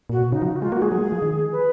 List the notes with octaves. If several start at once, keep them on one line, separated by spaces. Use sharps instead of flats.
A#2 F#4
B2
C#3 D#4
F3
F#4
G#3 F4
A#3 F#4
G#3 G#4
F#3
A#3
G#3
F3
D#3
B4